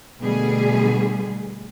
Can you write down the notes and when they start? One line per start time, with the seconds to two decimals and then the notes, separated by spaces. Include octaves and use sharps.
0.20 B2 D3 G3 A3 G#4